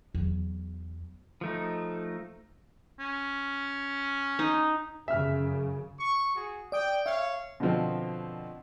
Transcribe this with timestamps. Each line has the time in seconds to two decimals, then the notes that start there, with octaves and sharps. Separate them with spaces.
0.14 E2 F#3
1.41 F3 A3 D#4
2.99 C#4
4.39 D#4
5.08 F#2 C#3 E5 F6
6.00 C#6
6.36 F#4 G#4
6.72 D5 G5 D#6
7.06 C#5 E5 F5
7.60 B2 D3 F3 C4